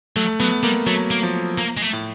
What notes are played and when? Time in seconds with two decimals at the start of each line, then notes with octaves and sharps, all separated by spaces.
0.16 F#3 A3
0.40 F#3 B3
0.63 G3 A#3
0.87 F#3 A3
1.11 A#3
1.23 F3
1.58 A#3
1.77 G#3
1.82 A3
1.93 A2